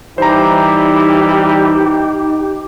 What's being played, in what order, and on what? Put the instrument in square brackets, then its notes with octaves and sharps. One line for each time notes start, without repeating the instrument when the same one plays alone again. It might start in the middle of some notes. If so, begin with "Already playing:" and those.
[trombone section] E3 G3 [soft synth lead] D#4 [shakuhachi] G4 [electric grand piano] C5 A#5